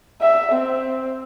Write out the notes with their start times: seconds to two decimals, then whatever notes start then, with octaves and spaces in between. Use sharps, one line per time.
0.21 E5
0.52 C4